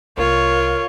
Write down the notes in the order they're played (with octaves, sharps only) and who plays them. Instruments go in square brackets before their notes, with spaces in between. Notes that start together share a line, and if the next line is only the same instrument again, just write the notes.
[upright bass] C2 A#3 [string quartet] F4 [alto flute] A#4 [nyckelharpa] C#5